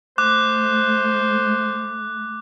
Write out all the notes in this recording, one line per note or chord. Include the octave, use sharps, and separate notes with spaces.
A3 C5 D6 F#6